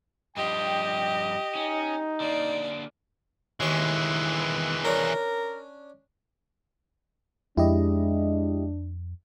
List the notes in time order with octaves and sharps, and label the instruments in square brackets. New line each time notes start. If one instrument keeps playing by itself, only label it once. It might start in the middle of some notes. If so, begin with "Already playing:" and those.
[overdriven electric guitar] G2 F3 [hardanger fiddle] G4 [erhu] D#5 [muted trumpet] G5
[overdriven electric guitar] C#4 [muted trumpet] D#4
[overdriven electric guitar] D3 A#3 [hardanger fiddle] D5
[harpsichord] D#2 C#6 [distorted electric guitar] E3 G#3
[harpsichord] C#4 D4 [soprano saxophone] A#4
[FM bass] F2 [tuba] G#3 [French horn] D4 [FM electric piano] E4 G4 D#5